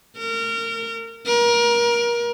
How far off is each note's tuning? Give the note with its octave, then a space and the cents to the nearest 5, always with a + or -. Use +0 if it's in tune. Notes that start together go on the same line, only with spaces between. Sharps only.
A#4 -25
A#4 +30